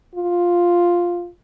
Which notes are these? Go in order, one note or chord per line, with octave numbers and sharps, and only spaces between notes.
F4